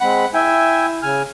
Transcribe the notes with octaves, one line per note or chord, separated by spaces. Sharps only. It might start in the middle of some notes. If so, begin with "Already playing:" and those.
G#3 C4 F#5 B5
E4 E5 G5 G#5
C#3 G#5 F6